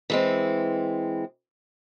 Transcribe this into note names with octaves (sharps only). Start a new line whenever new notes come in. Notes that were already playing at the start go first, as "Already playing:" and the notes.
E3 G#3 C4